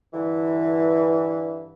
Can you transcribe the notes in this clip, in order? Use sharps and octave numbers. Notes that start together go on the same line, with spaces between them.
G2 D3 E3